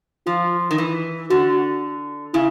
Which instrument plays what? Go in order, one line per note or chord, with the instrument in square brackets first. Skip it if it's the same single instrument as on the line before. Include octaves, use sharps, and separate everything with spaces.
[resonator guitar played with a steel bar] F3 [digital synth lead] F4
[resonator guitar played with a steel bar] D#3
E3
[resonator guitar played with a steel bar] D3 [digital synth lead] F#4
[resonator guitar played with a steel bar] C#3 [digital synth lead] E4